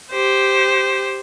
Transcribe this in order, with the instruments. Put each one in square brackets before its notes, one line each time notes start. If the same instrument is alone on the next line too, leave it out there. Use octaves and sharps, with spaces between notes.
[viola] G4 C5